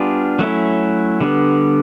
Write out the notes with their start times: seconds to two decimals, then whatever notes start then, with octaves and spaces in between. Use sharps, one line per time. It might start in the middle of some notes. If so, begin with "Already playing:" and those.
Already playing: G3 B3 D4 F4 G#4
0.39 F#3 A3 C#4 E4
1.21 D3 G3 B3